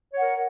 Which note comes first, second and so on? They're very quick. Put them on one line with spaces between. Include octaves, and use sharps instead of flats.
C#5 F#5 A#4